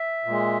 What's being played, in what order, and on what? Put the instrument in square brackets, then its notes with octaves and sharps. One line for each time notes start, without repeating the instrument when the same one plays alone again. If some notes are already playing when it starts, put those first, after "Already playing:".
Already playing: [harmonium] E5
A#2 G#3